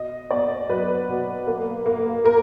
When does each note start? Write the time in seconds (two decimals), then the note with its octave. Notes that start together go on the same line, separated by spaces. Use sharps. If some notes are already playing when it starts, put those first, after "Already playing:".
Already playing: B2 D#5
0.30 B3 D5
0.69 F#3 B4
1.09 B2
1.47 A#3
1.86 A#3
2.25 A#3 A#4